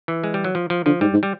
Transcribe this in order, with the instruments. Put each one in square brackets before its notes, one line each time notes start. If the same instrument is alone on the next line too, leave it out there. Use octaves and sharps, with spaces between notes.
[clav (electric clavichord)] E3
G#3
G3
F#3
F3
F3
[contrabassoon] D3 [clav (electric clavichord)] F3
[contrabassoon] G#2 [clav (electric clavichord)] G3
[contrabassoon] G#2
[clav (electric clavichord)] G3